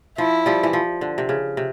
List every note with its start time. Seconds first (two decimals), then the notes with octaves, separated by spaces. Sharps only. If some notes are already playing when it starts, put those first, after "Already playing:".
0.18 F3 E4
0.46 F3 G3
0.63 E3
0.73 F3
1.01 D3
1.18 C3
1.29 C#3
1.57 C3